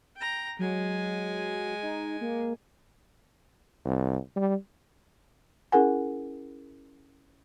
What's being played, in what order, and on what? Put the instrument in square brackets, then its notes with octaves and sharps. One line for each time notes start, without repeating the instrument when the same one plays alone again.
[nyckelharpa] G5 A#5
[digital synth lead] F#3 [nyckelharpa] G#3 G#5
[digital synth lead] D#4
A#3
[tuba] C2
G3
[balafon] C#4 E4 G#4 A#4 F#5 G#5